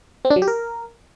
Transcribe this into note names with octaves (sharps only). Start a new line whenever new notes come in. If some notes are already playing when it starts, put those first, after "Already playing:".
C4
D4
F#3
G4
A#4